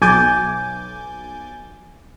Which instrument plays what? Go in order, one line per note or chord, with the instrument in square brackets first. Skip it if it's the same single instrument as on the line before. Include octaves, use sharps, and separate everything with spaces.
[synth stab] B1 G#5 D6 G6 A6